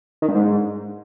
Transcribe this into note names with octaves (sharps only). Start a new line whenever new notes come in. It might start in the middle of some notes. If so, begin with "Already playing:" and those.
D#3
G2
G#2